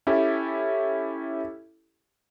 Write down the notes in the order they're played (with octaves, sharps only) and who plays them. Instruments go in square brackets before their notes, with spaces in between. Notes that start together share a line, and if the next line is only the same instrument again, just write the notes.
[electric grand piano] C#4 E4 G4 A4